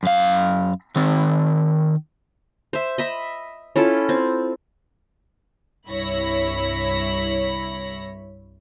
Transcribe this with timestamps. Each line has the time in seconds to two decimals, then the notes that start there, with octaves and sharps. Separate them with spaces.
0.03 F#2 F5
0.96 D#3 C4
2.73 C5 E5
2.98 D#5 E5 B5
3.76 C#4 E4 F4 A4
4.09 C4
5.87 C2 G2 E4 C#5 B5 A#6